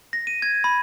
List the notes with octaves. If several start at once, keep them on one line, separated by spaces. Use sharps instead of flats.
A#6
D#7
G#6
B5